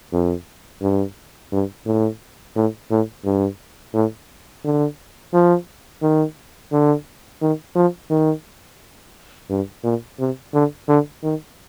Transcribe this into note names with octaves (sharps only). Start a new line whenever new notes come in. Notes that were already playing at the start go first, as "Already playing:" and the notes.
F2
G2
G2
A2
A2
A2
G2
A2
D3
F3
D#3
D3
D#3
F3
D#3
G2
A#2
C3
D3
D3
D#3